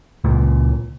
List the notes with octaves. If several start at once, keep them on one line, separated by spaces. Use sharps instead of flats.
C#2 A#2